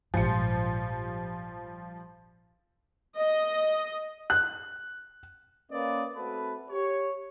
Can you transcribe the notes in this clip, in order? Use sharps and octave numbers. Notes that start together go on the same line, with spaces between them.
A#1 G#2 F3 G3 C#7
D#5
F#6
A#3 C#4 B4 D5 D#5
A3 C4 F#4 A4 B4
G4 C#5